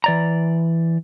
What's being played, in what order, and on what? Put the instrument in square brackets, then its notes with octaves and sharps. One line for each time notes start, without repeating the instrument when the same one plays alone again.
[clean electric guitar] E3 D5 A#5